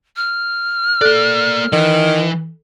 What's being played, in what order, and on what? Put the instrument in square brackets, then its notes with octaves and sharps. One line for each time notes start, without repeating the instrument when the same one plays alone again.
[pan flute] F6
[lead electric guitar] A#3 D5 [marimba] A4 F#6
[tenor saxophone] D#3 [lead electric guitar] E3